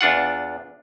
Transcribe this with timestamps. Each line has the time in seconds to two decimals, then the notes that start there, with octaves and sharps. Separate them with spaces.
0.01 E2 D4 F4 F#5